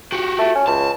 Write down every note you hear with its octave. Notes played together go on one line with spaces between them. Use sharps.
F#4 G4
A3
C#4
C#2 A5